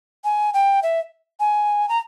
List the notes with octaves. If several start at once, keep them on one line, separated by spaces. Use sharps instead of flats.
G#5
G5
E5
G#5
A#5